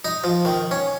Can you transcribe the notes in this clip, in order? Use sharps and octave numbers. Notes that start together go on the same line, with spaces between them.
D#4
F3
D#3
C#4